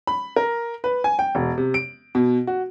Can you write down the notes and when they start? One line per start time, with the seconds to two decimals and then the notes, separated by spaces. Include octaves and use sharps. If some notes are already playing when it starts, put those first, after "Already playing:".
0.07 B5
0.36 A#4
0.84 B4
1.04 G#5
1.19 G5
1.35 E1
1.58 C3
1.74 D7
2.15 B2
2.47 F#4